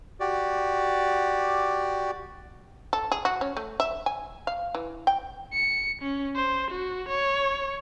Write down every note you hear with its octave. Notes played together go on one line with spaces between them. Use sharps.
F#4 G4 D5
A4
G#4
F#4
C#4
A3
E5
G#5
F5
E3
G5
C#7
C#4
C5
F#4
C#5